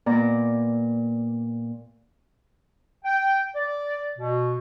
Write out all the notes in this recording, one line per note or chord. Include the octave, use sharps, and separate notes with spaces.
A#2 B3 D5 A#5
G5
D5
B2